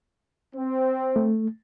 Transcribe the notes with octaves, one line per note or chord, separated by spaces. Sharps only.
C4
A3